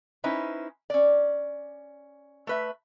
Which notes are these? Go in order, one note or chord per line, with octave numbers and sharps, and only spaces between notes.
C#4 D#4 E4 B4 C5
C#4 D5
A3 B4 E5